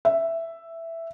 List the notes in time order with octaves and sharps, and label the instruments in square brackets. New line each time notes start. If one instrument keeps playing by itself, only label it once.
[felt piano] E5